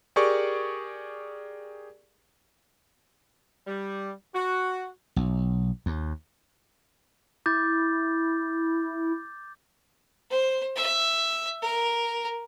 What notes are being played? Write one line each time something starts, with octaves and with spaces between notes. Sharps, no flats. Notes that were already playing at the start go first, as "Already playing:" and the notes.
G4 G#4 A#4 D5 C#6
G3
F#4
B1
D#2
E4 D6 G6 A6
C5
E5
A#4